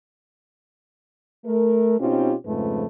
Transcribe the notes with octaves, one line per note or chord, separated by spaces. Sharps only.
A3 A#4
B2 C4 C#4 D#4 F4 G4
F2 G#2 C#3 F3 A3 B4